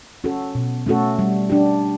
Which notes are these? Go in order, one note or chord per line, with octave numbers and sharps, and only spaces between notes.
C#4 F#4 A4
B2
A3 C#4 F#4 A4
G3
D4 G4